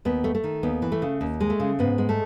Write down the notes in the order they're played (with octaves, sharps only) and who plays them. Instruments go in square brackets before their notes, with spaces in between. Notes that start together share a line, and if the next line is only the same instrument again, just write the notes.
[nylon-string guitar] D#2 B3
A3
A3
D#3
D#2 B3
E3
A3
C#3
D#2
G#3
A3
C#3
G#2 B3
G#3
A3